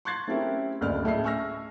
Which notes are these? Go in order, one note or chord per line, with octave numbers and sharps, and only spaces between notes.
C6 C#6 F#6 G#6 A6 C7
A3 C4 C#4 E4 G4 A#4
F#1 D2 D5 F6
A2 A3 C#4 G#4 D#5 C7
E5 G#5 C#6 E6 F6 A#6